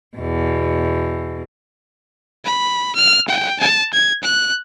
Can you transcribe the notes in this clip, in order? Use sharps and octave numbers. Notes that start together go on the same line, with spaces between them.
E2 B2
B5
F6
G5
A5
G#6
F#6